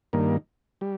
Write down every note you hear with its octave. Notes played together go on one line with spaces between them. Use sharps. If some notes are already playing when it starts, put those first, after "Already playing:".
G2 D#3 A#3
G3